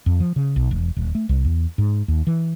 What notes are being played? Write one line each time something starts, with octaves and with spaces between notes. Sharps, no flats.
F2
F3
C#3
B1
E1
D#1
A3
C2
E2
G#2
D#2
E3